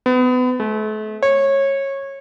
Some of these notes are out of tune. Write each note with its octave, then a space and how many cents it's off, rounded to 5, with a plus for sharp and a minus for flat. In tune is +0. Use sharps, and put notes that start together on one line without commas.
B3 +30
A3 -40
C#5 -20